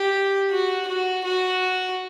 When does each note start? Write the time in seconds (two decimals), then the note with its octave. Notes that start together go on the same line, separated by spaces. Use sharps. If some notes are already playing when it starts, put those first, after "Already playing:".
Already playing: G4
0.51 F#4
0.88 F#4
1.24 F#4